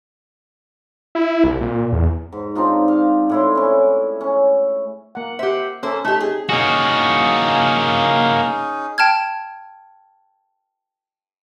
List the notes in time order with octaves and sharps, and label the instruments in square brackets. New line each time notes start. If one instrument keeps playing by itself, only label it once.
[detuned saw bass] E4
C2
A#2
E2
[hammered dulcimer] G#2
C4 D4 D#4 F4
F5
A2 E4 C6
C#4 E4
C#4
[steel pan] A#3 F#5
[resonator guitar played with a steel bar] G4 E5 [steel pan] C5 F#5
[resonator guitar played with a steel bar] A#3 C5 [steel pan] C#4 A4 E5
[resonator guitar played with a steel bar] A3 G4 [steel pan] D#4
[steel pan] C4 [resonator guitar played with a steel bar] G#4
[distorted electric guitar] A#3 F#4 [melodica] C#4 D#4 G#4
[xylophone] G5 A5 F6 G#6